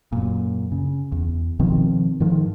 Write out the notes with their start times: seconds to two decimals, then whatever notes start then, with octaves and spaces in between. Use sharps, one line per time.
0.12 F#2 A#2
0.72 C#3
1.12 E2
1.59 B2 D#3 F3 C4
2.20 G#2 D#3 F3